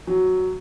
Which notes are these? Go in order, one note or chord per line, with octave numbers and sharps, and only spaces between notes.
F#3